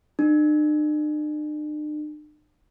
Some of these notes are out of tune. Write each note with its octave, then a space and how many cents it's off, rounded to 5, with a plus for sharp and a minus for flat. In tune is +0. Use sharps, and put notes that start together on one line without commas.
D4 +45